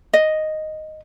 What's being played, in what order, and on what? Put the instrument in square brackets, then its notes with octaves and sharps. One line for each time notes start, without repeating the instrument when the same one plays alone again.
[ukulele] D#5